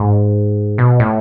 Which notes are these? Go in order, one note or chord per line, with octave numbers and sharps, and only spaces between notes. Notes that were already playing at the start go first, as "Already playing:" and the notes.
Already playing: G#2
B2
A2